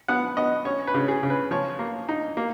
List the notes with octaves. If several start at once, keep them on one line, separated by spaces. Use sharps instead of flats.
B3 F#5
B3 D#5
C#4 C#5
B4
C#3
G#4
C#3
B4
F3 C#5
A#3
D#4
A#3